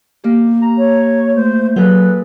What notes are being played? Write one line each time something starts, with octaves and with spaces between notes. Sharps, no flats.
A#3 G4
A#5
C#5
A3 C5
A#2 F#3 G#4 A4 B4 B5